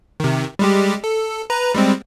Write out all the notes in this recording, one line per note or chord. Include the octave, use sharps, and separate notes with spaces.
C3 D#3
G3 G#3 G4
A4
B4 A#5
G3 G#3 C4